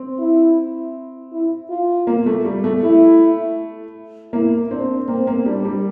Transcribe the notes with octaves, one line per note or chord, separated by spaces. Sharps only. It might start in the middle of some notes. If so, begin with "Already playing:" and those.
Already playing: C4
E4
E4
F4
A#3
A3
G3
A3
E4
A#3 E4
C4 D4
A#3 C4
A#3
G3 D4
G3